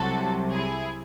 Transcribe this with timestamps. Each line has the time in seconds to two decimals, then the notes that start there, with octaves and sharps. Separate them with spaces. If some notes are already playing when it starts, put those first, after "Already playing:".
Already playing: C2 C3 F#3 F#4 A4
0.53 E4 G#4